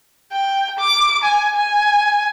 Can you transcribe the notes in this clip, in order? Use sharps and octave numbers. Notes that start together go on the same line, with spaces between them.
G5
D6
G#5
G#5